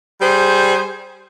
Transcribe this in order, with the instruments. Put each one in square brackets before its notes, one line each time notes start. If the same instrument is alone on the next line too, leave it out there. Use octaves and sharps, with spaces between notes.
[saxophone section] G3 G#4 C5